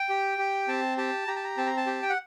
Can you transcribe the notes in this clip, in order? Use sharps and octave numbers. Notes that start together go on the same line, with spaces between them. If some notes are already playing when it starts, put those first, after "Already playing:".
Already playing: G5
G4
G4
C4 A5
G4 A5
G4 A#5
A5
A#5
C4 A5
A#5
A5
G4
G5
F#5